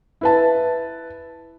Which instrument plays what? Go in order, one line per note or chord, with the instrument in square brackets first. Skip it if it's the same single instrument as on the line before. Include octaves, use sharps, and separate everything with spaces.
[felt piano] E4 B4 A5